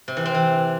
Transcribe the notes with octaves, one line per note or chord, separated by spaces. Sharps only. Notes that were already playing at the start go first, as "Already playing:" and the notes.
C3
E3
C4
E3